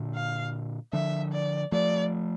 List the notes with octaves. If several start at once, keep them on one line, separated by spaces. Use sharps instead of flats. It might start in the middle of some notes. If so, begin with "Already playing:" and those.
Already playing: A#2 D3
F5
D3 F3 E5
D5
F3 A3 D5